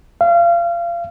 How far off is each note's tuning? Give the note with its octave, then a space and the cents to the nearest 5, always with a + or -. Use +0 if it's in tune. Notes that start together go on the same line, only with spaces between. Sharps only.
F5 -30